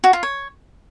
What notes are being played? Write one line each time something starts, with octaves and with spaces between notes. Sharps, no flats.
F#4
F4
C#5